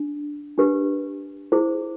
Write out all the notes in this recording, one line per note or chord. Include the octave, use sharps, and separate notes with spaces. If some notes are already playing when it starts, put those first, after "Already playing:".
Already playing: D4
D4 G4 B4
E4 G#4 C5